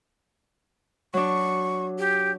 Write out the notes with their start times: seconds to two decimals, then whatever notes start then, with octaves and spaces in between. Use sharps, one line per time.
1.14 F#3 D4 C#6
1.98 G4